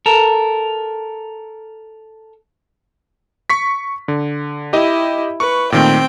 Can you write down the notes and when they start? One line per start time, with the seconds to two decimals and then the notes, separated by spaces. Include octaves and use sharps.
0.06 A4 A#4
3.50 C#6 B6
4.08 D3
4.73 E4 G4 D#5
5.40 B4 C#6
5.72 A#2 D#3 A3 C4 G5